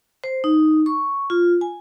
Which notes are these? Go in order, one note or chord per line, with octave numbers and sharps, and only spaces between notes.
C5
D#4
C#6
F4
G#5